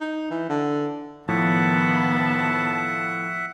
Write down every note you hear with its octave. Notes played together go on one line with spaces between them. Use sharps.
D#4
E3
D3
A2 D#3 F3 B3 E5 F#5 A5